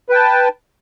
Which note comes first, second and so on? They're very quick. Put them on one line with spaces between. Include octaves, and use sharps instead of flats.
B4 G5 A5